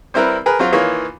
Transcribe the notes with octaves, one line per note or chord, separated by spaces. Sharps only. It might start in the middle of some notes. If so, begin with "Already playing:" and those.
G3 C4 E4 A#4 B4
G#4 A#4 B4
F#3 C4 F4
D#3 E3 A#3 F4 C#5